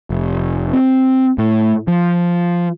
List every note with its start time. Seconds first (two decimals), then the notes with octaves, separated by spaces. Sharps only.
0.10 F1
0.73 C4
1.38 A2
1.88 F3